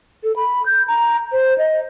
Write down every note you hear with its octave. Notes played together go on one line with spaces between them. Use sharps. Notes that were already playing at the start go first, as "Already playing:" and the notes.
A4
B5
G6
A#5
C5
D#5